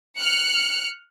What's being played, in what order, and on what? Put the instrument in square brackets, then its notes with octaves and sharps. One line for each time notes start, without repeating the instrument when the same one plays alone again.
[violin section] F6 F#6 C#7